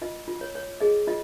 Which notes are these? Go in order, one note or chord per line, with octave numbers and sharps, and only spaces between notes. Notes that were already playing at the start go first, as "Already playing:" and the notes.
F4 D#5
F4
C#5
C#5
G#4 D#5
F4 D#5